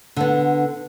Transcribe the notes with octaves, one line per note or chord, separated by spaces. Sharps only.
D3 B3